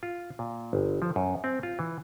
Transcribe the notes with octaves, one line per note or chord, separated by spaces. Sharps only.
F4
A#2
G1
F3
F#2
C4
F4
E3